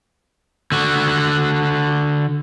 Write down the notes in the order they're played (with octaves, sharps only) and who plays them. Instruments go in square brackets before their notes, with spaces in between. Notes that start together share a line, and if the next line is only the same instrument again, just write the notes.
[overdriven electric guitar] D3 F#4